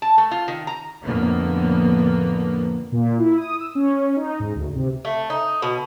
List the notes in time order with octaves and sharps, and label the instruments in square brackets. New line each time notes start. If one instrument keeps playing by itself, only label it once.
[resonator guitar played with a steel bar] A5
A3
F4
D#3
A#5
[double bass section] F2 A2 D3 A#3 B3
[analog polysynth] A#2
E4
D#6
E6
C#4
D#4
G#2
D2
C3
[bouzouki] A3
D#4
B2